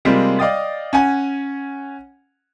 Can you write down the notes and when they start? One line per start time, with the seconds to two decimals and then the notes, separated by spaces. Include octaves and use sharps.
0.05 C3 G3 G#3 A#3 C4 F4
0.39 D5 D#5 F5 G5 D#6 A6
0.93 C#4 F#5 G#5